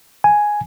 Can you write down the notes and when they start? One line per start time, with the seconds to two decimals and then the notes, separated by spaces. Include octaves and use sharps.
0.24 G#5